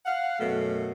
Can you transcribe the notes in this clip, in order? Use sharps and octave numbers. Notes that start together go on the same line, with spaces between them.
F5 F#5
F#2 B2 A3